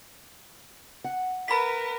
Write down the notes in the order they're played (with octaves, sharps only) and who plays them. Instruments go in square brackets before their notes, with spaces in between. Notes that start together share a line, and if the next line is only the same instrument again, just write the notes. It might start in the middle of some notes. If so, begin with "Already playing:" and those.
[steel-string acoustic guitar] F#5
[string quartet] A#4 B4 [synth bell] B5 B6